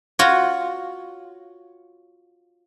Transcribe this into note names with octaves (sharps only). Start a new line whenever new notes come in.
F4 F#4 C#5